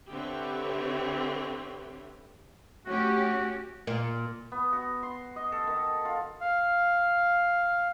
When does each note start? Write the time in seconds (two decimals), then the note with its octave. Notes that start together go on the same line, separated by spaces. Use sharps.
0.11 D3 C4 G4 B4 C#5 E5
2.86 A3 C#4 F#4 G4
3.87 A#2
4.52 B3
4.73 F#4
5.03 C6
5.36 D#5
5.52 A4
5.67 D#3
6.05 F4
6.41 F5